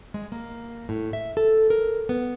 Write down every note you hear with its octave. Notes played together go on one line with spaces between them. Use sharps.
G#3
A#3
A2
E5
A4
A#4
B3